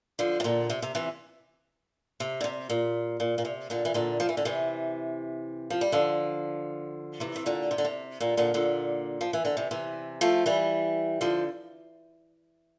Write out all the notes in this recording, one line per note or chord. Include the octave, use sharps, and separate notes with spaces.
D3 F3
C3
A#2 D3
C3
C3
C3 E3
C3
D3
C3
A#2
A#2
A#2
C3
A#2 D3
E3
A#2 D3
F3
E3
D3
C3 E3
F3
G3
D3 F3
C3 E3
C3
A#2 D3
C3
D3
C3
A#2 D3
A#2 D3
A#2 D3
F3
E3
D3
C3 E3
C3 E3
F3 A3
E3 G3
D3 F3